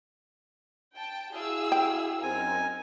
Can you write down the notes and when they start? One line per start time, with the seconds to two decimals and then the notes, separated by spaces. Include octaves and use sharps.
0.96 G5 A5
1.33 E4 F#4 G#4 F5 E6
1.72 G5
2.23 F#2 C4 D#4 A#4 G#5